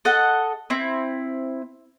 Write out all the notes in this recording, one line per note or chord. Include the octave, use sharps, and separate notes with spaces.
A4 D#5 F#5
C4 E4